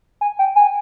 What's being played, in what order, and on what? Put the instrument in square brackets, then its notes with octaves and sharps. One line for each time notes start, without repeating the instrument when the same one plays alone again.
[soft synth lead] G#5
G5
G#5